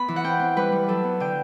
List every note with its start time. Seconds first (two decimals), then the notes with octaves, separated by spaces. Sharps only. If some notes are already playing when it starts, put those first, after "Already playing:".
Already playing: B3 B5
0.08 E3
0.16 F#5
0.24 C4 G5
0.39 C4
0.56 G3 B4
0.72 G3
0.88 F#3 A4
1.04 B3
1.20 D3 G5